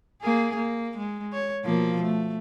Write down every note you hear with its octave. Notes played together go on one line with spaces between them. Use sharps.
A#3 G#4
A#3
G#3
C#5
B2 F3 A#3
A3